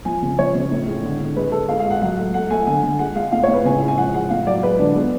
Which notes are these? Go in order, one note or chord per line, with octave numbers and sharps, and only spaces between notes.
F3 G#5
C#3
F3 C#5
C#3
A2
G#3
D3
D3
G#3 B4
G#3 A4
G#3 F5
F5
G#3
F#5
F#3 F#5
A3
A3 F#5
A3 G#5
D3 G#5
D3
G#3 F#5
G#3 F5
A2 F5
A2 C#5
B4
C#3 G#5
G#3
G#5
F3 F#5
G#3 F#5
A2 F5
F#3 D5
G#3 B4
D3 D4
G#3 B3